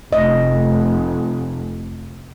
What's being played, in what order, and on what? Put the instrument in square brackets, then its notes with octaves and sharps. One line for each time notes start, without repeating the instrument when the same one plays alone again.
[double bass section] F1 [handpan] D#5